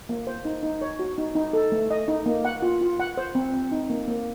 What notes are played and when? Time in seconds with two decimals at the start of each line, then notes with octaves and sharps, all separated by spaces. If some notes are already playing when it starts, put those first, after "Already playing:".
0.09 A#3
0.27 C5
0.45 D#4
0.63 D#4
0.82 C#5
0.99 F#4
1.18 D#4
1.35 D#4
1.53 A4
1.72 A3
1.90 D#5
2.08 D#4
2.26 A#3
2.45 F#5
2.62 F4
2.81 F4
3.00 F#5
3.17 C5
3.35 C4
3.54 C4
3.72 D#4
3.90 A#3
4.08 A#3